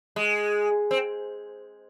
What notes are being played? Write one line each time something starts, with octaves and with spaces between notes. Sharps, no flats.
G#3
C4